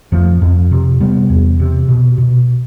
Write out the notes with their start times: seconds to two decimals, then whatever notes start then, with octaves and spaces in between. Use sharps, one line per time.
0.12 F2 F3 A3
0.42 F2
0.71 C3
1.00 C3 G3 B3
1.30 E2
1.59 C3
1.88 B2
2.18 B2